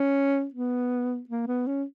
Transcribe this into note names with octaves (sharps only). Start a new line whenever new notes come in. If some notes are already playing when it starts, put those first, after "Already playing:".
Already playing: C#4
B3
A#3
B3
C#4